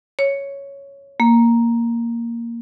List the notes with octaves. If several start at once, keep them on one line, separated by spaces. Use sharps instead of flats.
C#5
A#3